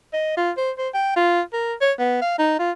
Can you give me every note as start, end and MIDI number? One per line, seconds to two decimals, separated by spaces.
0.13 0.33 75
0.37 0.51 65
0.57 0.71 72
0.78 0.89 72
0.94 1.12 79
1.16 1.41 65
1.53 1.74 70
1.81 1.92 73
1.99 2.21 59
2.22 2.38 77
2.38 2.59 63
2.59 2.72 65